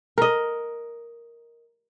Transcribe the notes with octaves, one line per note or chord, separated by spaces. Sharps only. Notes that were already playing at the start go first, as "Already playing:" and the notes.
A#4 D#5